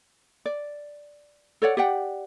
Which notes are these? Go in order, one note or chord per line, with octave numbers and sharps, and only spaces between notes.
D5
A4 C#5 D5 F#5
G4 D5 F#5 G5